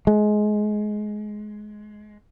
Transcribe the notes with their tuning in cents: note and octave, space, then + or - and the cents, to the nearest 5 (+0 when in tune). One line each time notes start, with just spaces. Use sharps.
G#3 +20